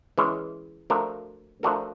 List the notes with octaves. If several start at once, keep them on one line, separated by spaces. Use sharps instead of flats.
E3 G#3 C#4
F3 A3 D4 F#4 A#4
F3 A3 D4 F#4 A#4